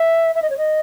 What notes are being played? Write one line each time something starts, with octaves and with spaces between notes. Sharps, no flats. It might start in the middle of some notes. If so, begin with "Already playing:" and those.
Already playing: E5
E5
D#5
C#5
D#5